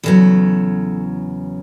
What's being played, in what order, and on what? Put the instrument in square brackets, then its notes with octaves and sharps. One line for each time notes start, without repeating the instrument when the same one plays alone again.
[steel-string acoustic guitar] E2 C#3 F#3 A4